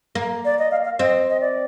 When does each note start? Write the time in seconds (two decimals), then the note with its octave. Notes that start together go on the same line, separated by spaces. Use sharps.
0.15 A#3
0.45 D5
0.59 D#5
0.71 F5
0.85 F5
0.99 C4 D#5
1.30 D#5
1.40 D5